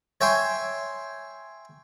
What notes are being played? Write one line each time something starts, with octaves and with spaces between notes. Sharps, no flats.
C#5 E5 G5 G#5 C6